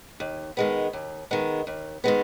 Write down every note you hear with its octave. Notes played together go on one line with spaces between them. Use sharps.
D#2
D#3 G#3 B3
D#2
D#3 G#3 B3
D#2
D#3 G#3 B3